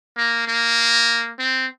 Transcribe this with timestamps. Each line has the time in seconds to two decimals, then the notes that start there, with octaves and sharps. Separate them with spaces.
0.17 A#3
0.48 A#3
1.39 C4